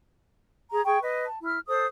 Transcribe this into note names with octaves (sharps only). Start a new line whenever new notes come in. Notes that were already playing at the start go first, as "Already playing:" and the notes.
G#4 A#5
G#4 G5 C#6
B4 D#5
A5
E4 F6
A4 C5 D#6